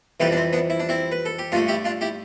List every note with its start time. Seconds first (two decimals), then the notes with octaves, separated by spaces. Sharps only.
0.20 F2 C3 E3 G3 G4 B4
0.32 D4
0.37 C4
0.53 B3 D4
0.70 E4
0.80 D4
0.89 C4 E4
1.12 B4
1.25 A4
1.39 G4
1.52 G2 D3 A3 D4 F4
1.68 E4 G4
1.85 D4 F4
2.01 E4 G4